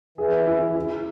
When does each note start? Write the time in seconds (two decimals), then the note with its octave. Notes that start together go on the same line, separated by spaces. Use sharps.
0.18 E3 G#4
0.47 E4
0.75 E4